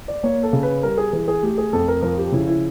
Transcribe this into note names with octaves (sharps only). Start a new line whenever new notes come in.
D5
A#3 C#5
A4
C#3
B4
G3 A#4
G#4
E3 G#4
G#4
A3 G4
G#4
F2 A4
A#4
F3 A#4
G4
C#3 E4
E4